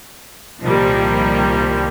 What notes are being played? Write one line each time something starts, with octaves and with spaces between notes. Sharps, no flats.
C2 A#2 D#3 F3 G3 A#3